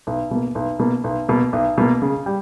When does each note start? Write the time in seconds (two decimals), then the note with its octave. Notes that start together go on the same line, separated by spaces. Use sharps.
0.07 B1
0.31 B2 A#3
0.55 B1
0.79 B2 A#3
1.04 B1
1.29 B2 A#3
1.53 B1
1.78 B2 A#3
2.02 C#3
2.26 G3